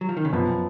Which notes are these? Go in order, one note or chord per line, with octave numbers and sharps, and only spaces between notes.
F#3
F3
D#3
C#3
F#2 B2 F3 B3